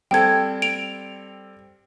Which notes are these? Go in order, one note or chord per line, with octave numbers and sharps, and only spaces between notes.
G3 C4 A4 G5 G#6
D7 F7